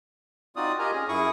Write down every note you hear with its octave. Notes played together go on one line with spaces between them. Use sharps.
C4 D#4 F4 F#4 D5 D#6
F4 G4 A#4 D#5 G#5 A#5
C#4 G#4
F#2 E4 G#4 C#6 D#6